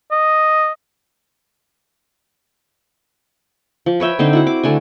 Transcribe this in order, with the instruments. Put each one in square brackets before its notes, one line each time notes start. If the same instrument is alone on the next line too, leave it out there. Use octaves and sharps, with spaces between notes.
[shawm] D#5
[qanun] F3
B4 C#5 E5 G5
D3 C4 D#4 C5
E4 F#4 F#5
D6
D3 A3 D4 G#5